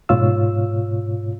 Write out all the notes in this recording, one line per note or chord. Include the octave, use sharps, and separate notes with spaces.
G#2 B2 F4 C#5 F5 E6